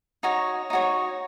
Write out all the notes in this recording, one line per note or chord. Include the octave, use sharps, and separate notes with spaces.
D#4 F#4 C#5
D#4 F#4 C#5